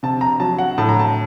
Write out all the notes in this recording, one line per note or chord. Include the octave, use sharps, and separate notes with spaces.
C3 A5
A#5
F#3 A5
F#5
A2 A5
A#5
A5